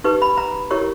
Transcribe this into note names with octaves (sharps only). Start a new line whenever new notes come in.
D#4 G4 B4 C#6
B5
A#5
E4 G4 A#4 C#5 C#6